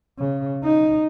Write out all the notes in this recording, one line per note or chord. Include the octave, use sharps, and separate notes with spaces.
C#3
D#4